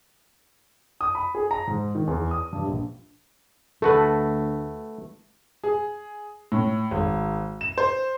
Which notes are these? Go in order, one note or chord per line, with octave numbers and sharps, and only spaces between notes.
D#6
B5
G#4
A#5
G#2
D#3
E2
D#6
G2
A#1
D2 A3 F#4 A4 B4
G#4
A2
G#1
E7
C5